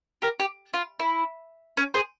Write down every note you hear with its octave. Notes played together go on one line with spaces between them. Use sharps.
G4 A#4
G4
F4
E4
C#4
G#4 C5